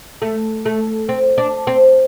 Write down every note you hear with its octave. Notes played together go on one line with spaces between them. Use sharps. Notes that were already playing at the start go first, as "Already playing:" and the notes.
A3
A3
C4
D4
C4